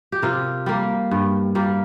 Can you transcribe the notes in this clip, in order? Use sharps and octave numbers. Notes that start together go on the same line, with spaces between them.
G4
C3 F4 A#4
G3 A#3
G2
G3 A#3